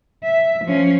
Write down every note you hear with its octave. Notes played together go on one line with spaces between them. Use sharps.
E5
F3 C#4